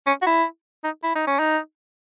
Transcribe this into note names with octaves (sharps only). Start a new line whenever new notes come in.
C#4
F#4
E4
D#4
E4
D#4
C#4
D#4